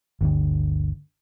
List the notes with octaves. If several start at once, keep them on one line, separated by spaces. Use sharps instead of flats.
G1 D2 D3